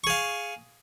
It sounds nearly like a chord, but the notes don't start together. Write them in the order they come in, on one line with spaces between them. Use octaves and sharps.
C#6 G#4 F5